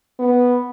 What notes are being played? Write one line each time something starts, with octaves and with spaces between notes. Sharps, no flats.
B3